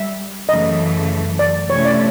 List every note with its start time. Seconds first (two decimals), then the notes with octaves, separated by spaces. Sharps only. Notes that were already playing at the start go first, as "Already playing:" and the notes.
Already playing: G3 E5
0.49 F#2 C#3 E3 A3 D#5
1.39 D5
1.70 C3 E3 A3 C#4 E4 C#5
1.85 D5